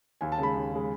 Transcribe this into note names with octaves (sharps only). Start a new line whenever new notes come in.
D#2 G#5
A5
C#3 G#3 B5
D#2
C#3 G#3